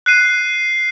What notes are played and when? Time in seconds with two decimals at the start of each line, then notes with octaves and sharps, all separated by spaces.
0.06 F#6 C7 D#7